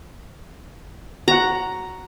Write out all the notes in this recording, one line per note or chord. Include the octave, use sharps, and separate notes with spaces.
F#4 F#5 A#5